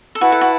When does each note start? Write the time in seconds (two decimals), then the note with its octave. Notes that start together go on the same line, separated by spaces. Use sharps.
0.15 A4
0.21 E4 F#4 B4 F#5 A5
0.32 A4
0.41 F#4